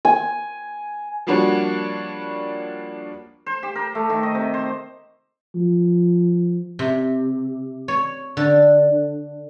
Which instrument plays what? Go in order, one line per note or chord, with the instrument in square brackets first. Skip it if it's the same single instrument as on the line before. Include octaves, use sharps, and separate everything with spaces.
[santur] G#5
[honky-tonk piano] F3 G3 A#3 D4 F#4 C#5
[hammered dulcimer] C5
G4
A#4
A3
D#3
D#5
C3
C5
[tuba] F3
[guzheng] C3
C#5
D3